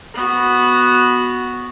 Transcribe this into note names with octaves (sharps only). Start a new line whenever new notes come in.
B3 F#4